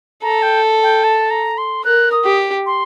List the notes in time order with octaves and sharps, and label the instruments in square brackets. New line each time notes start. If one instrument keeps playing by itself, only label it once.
[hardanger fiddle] A4 [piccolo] A#5
[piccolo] G5
G5
A5
A#5
C6
[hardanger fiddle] A#4 [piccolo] F#6
[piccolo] D#6
[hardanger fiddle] G4
[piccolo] C6